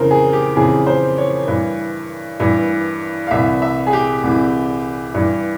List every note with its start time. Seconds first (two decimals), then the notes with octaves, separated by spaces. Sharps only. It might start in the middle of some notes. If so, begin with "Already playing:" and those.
Already playing: F2 C#3 E3 A#4 C5
0.11 G#4
0.33 G4
0.55 F2 C#3 E3 G#4
0.87 C5
1.18 C#5
1.48 G2 E3
2.40 G2 E3
3.27 F5
3.31 C2 C3 E3 E5
3.62 E5
3.87 G#4
3.93 G4
4.24 C2 C3 E3
5.14 G2 E3